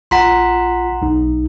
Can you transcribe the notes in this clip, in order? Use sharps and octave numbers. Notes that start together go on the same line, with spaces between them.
A#1 F4 F#5 A#5 C6 B6
B1 D#4